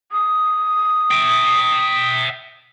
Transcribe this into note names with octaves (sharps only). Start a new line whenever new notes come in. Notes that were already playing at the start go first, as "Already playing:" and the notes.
D#6
E5 G5